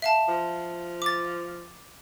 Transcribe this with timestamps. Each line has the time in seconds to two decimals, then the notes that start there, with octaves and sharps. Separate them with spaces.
0.02 E5 F5 A5
0.28 F3
1.02 D6 A6